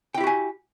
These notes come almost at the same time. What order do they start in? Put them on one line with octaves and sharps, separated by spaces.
G5 E4 G4 F#4 G#5